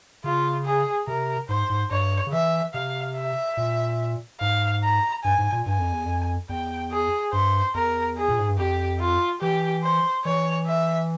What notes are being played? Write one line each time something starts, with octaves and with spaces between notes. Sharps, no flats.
C#3 F4
G#4
C3 A#4
G#2 C5
G#2
G2 C#5
C#3
E3 E5
C3 F5
E5
A#2
G#2 F5
A#5
G2 G#5
G#2
A#2
G2 G#5
F2
E2
F2
E2 G5
G#4
G2 C5
E2 A#4
G#4
A#2
G#2
G2
F2 G4
F4
E3 G4
C5
E3 C#5
E5